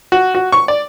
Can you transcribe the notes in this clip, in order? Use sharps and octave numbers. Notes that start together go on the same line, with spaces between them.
F#4
F#4
C#6
D5